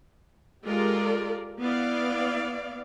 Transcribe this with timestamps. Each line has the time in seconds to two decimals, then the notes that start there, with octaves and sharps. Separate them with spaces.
0.66 G#3 F4 G4 A4 A#4 D5
1.60 B3 E4 D5 F5